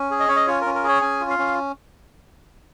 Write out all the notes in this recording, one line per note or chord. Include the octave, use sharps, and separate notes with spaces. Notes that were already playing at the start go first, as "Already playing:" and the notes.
Already playing: C#4
G#4
D#5
C#4 C#5
D#5
F4 C#5
A#4
C#4
A#4
G#4 C#5
C#4 G#5
F4
F5
C#4